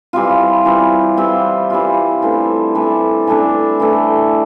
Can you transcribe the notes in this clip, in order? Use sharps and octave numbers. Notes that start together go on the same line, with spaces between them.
E3 G3 C4 F4
E3 G3 C4 F4
E3 G3 C4 F4
E3 G3 C4 F4
E3 A3 D4
E3 A3 D4
E3 A3 D4
E3 A3 D4